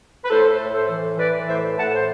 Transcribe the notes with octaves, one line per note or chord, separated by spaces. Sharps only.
B4
A2 A4 C5
A2
A4 C5
E3
E3 B4 D5
A2 C5 E5
A2 F#5 A5
C5